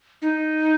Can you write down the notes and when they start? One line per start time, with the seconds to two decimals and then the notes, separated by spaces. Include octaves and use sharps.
0.22 D#4